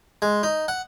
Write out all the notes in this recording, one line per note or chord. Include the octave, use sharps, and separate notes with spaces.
G#3
D#4
F#5